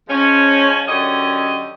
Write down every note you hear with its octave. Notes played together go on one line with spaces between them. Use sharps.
F3 G#3 C#4
F#2 D3 G4 C#5 D#5